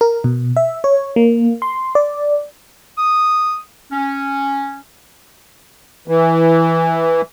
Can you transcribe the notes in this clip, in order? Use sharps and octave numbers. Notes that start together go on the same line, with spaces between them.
A#4
B2
E5
C#5
A#3
C6
D5
D#6
C#4
E3